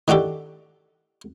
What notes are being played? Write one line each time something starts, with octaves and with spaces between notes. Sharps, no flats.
D#3 D4 F#4 G4 A4